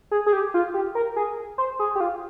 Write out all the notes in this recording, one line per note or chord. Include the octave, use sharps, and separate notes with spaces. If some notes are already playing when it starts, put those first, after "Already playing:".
G#4
G#4
G4
F4
G4
A#4
G#4
C5
G#4
G4
F4